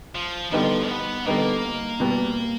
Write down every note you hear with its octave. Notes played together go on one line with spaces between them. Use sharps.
F3
D3 F3 G3 B3 D#4
B3
D3 G3 A#3 B3 D#4
B2 G3 B3